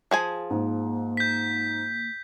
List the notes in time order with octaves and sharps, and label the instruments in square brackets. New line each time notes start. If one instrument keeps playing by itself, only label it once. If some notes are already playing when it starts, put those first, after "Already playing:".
[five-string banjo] F3 G#4 G#5
[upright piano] G#2 [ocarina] A#3
[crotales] G6 B6